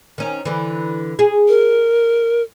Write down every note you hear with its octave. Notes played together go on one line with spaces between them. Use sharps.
D#3 C#4
D3 E3
G#4
A#4